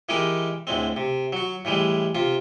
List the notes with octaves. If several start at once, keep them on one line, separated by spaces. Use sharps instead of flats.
E3 G#3 D#4 G4 A#4
D2 A2 G#3 C4
C3
F#3 F#4
A2 E3 G3 G#3
C3 F4